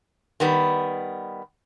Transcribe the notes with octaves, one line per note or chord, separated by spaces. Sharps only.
D#3 G3 B3